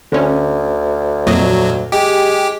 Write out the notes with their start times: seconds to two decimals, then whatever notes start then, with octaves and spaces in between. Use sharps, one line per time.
0.12 D2 D3 C#4
1.27 F2 A#2 F#3 D#5
1.92 G#3 G4